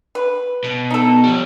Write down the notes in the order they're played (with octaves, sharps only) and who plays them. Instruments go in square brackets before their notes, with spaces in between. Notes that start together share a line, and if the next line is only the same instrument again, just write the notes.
[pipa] B4
[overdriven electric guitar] B2
[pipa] D#4 A4
[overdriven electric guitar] F3 G3